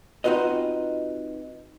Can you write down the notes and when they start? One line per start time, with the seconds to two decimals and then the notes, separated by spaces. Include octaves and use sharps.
0.24 C4 D#4 F4 F#4 B4 D#5